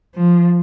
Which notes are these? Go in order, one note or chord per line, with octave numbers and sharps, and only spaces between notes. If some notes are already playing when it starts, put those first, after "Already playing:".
F3